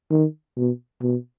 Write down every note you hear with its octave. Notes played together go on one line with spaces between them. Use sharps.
D#3
B2
B2